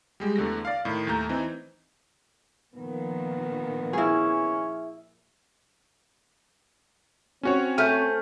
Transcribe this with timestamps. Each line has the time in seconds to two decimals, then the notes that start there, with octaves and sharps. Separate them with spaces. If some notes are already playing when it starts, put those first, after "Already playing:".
0.20 G3 G#3 G4
0.36 E2 D3 A3 A#6
0.65 D5 F5
0.85 A2 D#3
1.07 D#2 A3 A#5 G6
1.29 E3 C4 D#4
2.75 A#2 D#3 F3 B3
3.93 C#4 E4 G#4
7.43 C4 C#4 F#4 C#5
7.78 A3 G#5 F6 G6